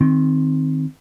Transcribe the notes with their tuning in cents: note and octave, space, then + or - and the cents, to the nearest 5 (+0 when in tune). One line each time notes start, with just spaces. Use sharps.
D#3 +0 C4 +0